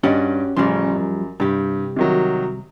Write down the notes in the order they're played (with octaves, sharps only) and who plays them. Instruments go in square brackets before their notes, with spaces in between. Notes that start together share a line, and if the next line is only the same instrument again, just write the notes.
[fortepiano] G2 D5 D#5 [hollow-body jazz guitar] C#4 F#4 G4
[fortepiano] A1 C#3 C6 [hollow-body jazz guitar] F3 G3
[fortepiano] F#2
[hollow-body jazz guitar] C2 G4 [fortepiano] G2
[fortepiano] C3 D#3 F#3